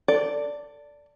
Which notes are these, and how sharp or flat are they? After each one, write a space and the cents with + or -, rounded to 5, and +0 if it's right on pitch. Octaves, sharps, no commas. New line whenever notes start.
A4 +25 D5 -10